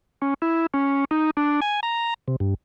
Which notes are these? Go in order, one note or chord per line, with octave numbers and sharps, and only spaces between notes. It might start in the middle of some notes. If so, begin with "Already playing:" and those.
C#4
E4
C#4
D#4
D4
G#5
A#5
C3
G2